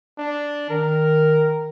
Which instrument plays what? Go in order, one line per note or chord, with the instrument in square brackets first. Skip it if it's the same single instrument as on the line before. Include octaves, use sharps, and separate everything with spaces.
[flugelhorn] D4
[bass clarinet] D#3 [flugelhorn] A#4